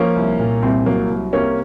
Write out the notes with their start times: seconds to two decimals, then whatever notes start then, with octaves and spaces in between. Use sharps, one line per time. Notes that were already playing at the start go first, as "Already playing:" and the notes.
Already playing: F3 A#3 C#4
0.16 C2
0.39 A#2
0.62 C2 C4
0.86 F#3 A#3
1.10 C2
1.33 C3 A#3 C#4